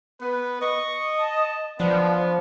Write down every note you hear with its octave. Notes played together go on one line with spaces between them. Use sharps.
B3 B4
D#5 C#6
A5
F3 B3 D4